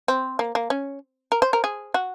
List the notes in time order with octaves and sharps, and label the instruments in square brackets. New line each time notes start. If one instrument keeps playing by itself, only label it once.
[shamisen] C4
A#3
A#3
C#4
A#4
C5
A#4
G#4
F#4